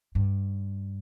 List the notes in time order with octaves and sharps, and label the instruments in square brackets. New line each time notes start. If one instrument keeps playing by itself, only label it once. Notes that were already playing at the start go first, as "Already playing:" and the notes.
[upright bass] G2